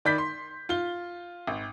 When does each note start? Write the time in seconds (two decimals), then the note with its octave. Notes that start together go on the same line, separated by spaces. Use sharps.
0.05 D#3 D5 B5 G6 B6
0.18 C6
0.69 F4 G7
1.47 G#1